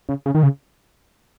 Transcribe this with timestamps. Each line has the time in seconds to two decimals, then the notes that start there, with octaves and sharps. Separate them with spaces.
0.09 C#3
0.26 C#3
0.35 D#3
0.43 C#3